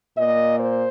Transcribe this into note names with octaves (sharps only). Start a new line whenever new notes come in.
A#2 A#3 D#5
C5